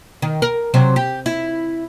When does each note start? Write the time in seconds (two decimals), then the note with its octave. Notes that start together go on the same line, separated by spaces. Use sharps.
0.22 D#3
0.42 A#4
0.74 C3 F#3 C5
0.96 G4
1.26 E4